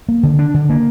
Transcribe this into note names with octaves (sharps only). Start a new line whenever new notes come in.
A#3
D3
D4
D3
A#3